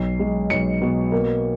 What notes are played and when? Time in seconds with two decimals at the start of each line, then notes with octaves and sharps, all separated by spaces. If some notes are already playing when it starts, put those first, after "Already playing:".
Already playing: B1 C7
0.19 G#3
0.50 B1 C#7
0.82 B2
1.12 A#3